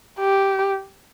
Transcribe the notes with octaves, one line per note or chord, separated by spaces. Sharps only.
G4